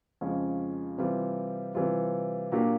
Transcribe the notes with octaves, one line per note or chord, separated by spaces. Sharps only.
F2 C#3 F3 G#3 C#4
C3 E3 G3 C4 F4
C3 E3 G3 C4 F4
A#2 F#3 A#3 D4 G4